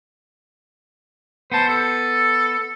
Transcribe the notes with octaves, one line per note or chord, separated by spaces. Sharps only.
B3 C5 A5
A4